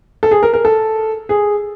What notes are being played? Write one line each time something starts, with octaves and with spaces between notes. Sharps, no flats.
A4
G#4
A#4
A#4
A4
G#4